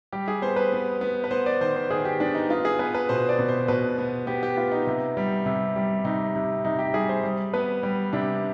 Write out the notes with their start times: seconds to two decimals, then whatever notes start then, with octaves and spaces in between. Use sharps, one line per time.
0.12 G3 G4
0.28 G#4
0.42 B3 C5
0.56 B4
0.72 B3
1.01 B3
1.24 B4
1.31 B3 C5
1.46 D5
1.61 D#3 C5
1.76 C5
1.90 D#3 G#4
2.05 G4
2.20 B3 D4
2.35 D#4
2.49 B3 F4
2.65 G#4
2.79 B3 B4
2.94 B4
3.09 B2 C5
3.29 D5
3.39 B2
3.48 C5
3.68 B2 B4
3.98 B3
4.27 B3 G4
4.43 G4
4.57 B3 F4
4.71 D#4
4.87 C3
5.17 G3
5.46 C3
5.76 G3
6.05 C3 D#4
6.35 C3
6.65 C3 D#4
6.79 G4
6.94 G3 G#4
7.09 C5
7.24 G3
7.53 B3 B4
7.83 G3
8.13 C3 D4